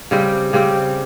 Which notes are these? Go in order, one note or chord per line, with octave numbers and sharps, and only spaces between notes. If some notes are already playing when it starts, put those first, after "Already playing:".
C#3 G3 C4 G4
C#3 G3 C4 G4